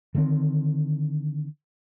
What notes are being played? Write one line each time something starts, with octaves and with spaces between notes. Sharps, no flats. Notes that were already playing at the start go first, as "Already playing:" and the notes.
D3 D#3 G#3 C4